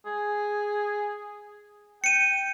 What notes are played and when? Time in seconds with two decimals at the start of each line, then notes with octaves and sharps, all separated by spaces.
0.06 G#4
2.04 G5 C#7 D#7